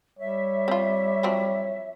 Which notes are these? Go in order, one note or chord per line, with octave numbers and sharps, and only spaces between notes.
G3 C#5 E5
C4 F4
F3 F#3 C4